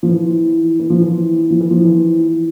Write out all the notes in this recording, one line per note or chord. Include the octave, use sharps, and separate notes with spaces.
F3
E3
E3
F3
E3
F3
E3
F3
E3